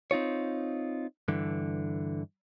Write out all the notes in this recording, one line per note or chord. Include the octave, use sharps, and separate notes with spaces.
C4 D#4 F4 C#5
G2 D3 E3